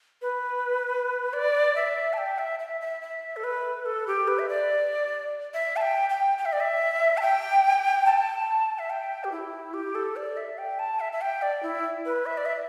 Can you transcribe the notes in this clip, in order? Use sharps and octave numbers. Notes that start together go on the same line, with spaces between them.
B4
D5
E5
A5
G5
E5
E5
E5
E5
A4
B4
A4
G4
B4
E5
D5
E5
A5
G5
G5
G5
E5
D5
E5
A5
G5
A5
E5
G5
G4
E4
G4
A4
D5
E5
G5
A5
E5
E5
G5
D5
E4
B4
E5
D5
E5